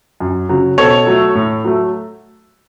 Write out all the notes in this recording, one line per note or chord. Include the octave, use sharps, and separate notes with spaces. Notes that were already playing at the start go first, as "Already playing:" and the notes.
F#2
C#3 F#3
B2 A4 C#5
F#3 A3
A2
F#3 A3